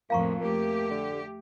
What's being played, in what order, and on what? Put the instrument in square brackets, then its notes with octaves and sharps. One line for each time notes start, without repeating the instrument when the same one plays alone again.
[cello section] F2 A2 F3 [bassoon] A#3 [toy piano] F5 A#5 C#6
[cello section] A3 G4 [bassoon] A#3
[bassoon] D3